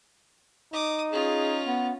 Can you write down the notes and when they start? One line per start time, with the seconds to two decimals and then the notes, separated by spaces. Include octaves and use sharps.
0.73 D#4 D6 D#6
1.12 C#4 F4 G#4
1.65 B3